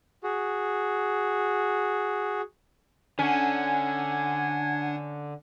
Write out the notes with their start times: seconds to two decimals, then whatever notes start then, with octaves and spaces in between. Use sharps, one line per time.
0.23 F#4 G#4
3.19 D3 C#4 D4 F#5 G#5